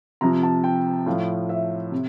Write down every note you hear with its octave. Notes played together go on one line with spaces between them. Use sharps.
C3 F3 A#5
A5
G5
A2 F3 F5
E5
C3